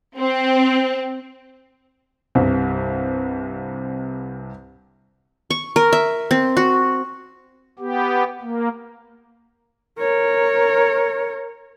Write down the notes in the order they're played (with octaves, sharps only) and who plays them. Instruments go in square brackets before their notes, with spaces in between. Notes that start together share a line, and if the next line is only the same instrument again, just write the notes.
[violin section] C4
[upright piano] C2 G2 C3
[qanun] C#6
A#4
E5
C4
F#4
[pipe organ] B3 G4
A#3
[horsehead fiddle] A#4 C#5